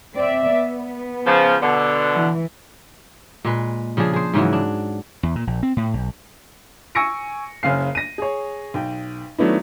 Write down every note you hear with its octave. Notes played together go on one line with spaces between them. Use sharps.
C4 D5 E5
B3
C#3 F3
B2 D3
E3
A#2 G#3 B4
C#3 F3 D4 G#4
G#4 C5
G#2 C#3 E3 F#3
D4
E2
A#2
A#1
C4
A2
B1
G#5 C#6 E6 A#6 C#7 D7
F#1 C#3 C#4 F5 C7
A#6 D#7
G#4 C#5
B1 G5
D#3 F#3 A3 B3 D4 E4